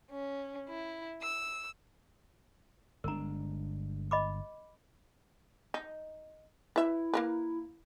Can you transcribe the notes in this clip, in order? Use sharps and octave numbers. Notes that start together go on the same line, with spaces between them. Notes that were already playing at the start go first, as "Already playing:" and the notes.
C#4
E4
E6
G1 G#3 D4 A#4 A#5
D#5 B5 D6
D#4
E4 B4 E5
A#3 A#4 B4